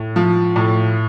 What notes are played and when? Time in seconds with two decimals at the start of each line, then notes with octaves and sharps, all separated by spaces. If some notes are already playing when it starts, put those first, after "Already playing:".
Already playing: A2
0.16 F3
0.56 A2